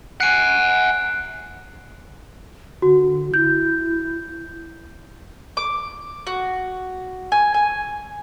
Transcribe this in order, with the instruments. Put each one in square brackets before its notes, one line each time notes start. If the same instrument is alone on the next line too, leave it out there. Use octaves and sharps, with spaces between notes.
[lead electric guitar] F#5 G#5 [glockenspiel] F#6 C7 D7
[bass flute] D3 [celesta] F#4
[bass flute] E4 [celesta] G6
[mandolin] D6
F#4
G#5
G#5